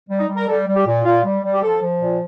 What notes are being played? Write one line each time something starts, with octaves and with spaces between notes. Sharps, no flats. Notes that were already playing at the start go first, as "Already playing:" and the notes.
G3
D#4
G3
A#4
G3 A4
G3
G4
A#2
A#2 F4
G3
G3
G4
F3 A4
F3
A#2